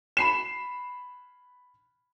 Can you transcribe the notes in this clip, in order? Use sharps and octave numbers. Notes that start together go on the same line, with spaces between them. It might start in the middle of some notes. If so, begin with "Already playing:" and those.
B5 C7 E7